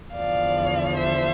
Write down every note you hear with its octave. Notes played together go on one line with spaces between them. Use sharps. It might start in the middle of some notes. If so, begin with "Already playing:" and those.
E2 D3 F3 D5 F5
C5 E5